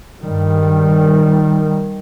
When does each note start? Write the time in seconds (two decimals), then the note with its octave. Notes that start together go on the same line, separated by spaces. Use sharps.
0.22 G2 D#3 G3